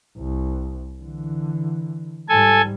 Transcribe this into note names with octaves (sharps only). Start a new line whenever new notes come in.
C2
D3 E3
G#2 G3 A4 G#5